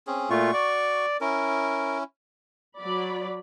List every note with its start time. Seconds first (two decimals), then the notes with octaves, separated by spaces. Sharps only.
0.07 C4 C#4 G#4
0.30 A#2 A3 F4 F#4 C#6
0.53 D5
1.21 C#4 E4 A#4
2.78 F#3 D5 B5